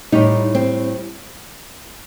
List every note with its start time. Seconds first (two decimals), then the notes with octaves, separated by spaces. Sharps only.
0.12 A2 G3 D#4
0.55 C4